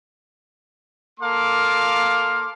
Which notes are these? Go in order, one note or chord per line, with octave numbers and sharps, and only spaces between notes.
A#3 A4 F5 C6 D6